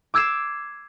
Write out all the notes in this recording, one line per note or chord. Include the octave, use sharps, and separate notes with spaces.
D6 E6 G#6 C7 E7